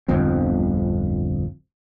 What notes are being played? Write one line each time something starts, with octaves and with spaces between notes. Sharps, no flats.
D1 G1 F2 C4